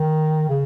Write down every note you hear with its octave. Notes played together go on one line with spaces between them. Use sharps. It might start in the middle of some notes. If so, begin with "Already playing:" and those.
Already playing: D#3
C#3